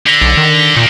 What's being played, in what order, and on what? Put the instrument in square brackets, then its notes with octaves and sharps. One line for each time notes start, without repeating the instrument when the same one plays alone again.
[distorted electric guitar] D3 [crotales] A#6 B6 G7
[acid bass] B1
D#3
[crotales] B6 G7
[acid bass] A#2 [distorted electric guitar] D#3 A#3